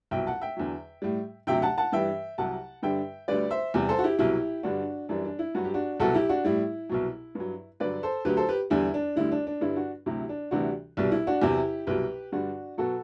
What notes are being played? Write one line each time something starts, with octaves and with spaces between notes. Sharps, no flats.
C2 B2 F#3 E5 G5
F#5 A5
E5 G5
E2 D3 F#3
A2 G3
D2 C3 F#3 E5 G5
F#5 A5
F#5 A5
G2 E3 G3 E5 G5
C2 C3 F#3 F#5 A5
G2 D3 G3 E5 G5
D2 D3 G3 B4 D5
C5 E5
E2 C3 G3
A4 C5
F#4
E4 G4
C2 B2 F#3 E4 G4
G2 D3 G3 D4 F#4
F#2 E3 G3 D4
D4
E4
G2 F#3 F#4
G4
D4 F#4
C2 B2 F#3 F#4 A4
E4 G4
D4 F#4
A2 G3 E4
C2 B2 F#3
G2 F#3
G2 D3 F#3 B4 D5
A4 C5
D2 D3 F#3 G4 B4
A4 C5
G4 B4
E2 D3 G3 E4
D4
D2 D3 G3 E4
D4
D4
G2 D3 G3 E4
D4 F#4
D2 C3 F#3 E4
D4
D2 C3 E3 G3 D4 F#4
C2 B2 G3 D4
E4
D4 F#4
E2 C3 F#3 E4 G4
C2 B2 F#3 G4 B4
G2 D3 G3 D4 F#4
B2 F#3 F#4 A4